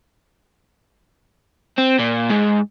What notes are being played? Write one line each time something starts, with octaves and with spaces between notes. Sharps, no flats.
C4
A#2
G#2